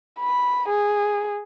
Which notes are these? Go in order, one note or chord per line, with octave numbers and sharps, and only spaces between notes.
B5
G#4